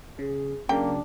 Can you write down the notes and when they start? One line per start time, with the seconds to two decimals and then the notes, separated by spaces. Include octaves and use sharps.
0.19 C#3 G#4
0.69 C#3 F#3 A#3 D4 G5